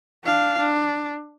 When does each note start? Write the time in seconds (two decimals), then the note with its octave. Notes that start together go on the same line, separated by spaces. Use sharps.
0.25 D4 F5
0.58 D4